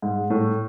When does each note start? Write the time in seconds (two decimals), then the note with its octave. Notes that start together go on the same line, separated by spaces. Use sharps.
0.02 G#2
0.30 A2